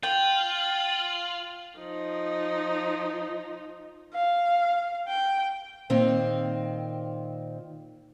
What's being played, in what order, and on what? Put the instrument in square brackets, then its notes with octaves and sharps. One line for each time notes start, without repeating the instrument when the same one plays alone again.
[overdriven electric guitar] F4 [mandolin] G5 [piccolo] F#7
[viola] F3 D#4
[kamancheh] F5
G5
[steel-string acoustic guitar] A#2 D#3 C4